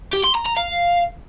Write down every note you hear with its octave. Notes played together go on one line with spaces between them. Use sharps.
G4
C6
A#5
A#5
F5